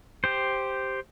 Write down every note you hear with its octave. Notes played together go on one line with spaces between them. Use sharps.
G4 C5